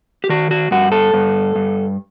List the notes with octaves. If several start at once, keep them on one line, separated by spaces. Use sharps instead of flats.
G4
D#3 F#4
F#4
G2 F#4
A4
G2
G2